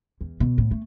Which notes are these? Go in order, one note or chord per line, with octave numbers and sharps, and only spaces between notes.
E2
B2
A2
A3